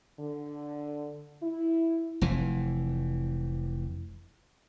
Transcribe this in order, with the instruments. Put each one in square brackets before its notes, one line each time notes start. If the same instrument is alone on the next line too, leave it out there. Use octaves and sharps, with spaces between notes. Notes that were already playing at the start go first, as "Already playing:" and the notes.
[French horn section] D3
E4
[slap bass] F1 F2 E3